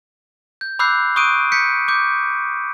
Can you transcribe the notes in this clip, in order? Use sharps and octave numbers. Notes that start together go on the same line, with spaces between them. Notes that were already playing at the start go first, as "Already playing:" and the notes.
G6
B5 D6 E6 F#6 G6 C7
C#6 D#6 F#6 G6 D7 D#7
G6 B6 C#7
D6 G6